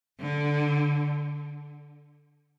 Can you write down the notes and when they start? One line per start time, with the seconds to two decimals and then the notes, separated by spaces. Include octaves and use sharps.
0.20 D3